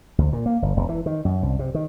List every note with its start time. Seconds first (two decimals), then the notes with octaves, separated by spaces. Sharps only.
0.18 D2
0.33 A#2
0.46 A#3
0.62 G1
0.77 E1
0.89 E3
1.06 D#3
1.25 F#2
1.43 C2
1.59 C3
1.74 D#3